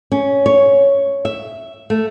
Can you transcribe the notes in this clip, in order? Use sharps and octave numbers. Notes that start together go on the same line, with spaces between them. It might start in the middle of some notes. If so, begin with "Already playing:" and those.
C#4
C#5
E5
A3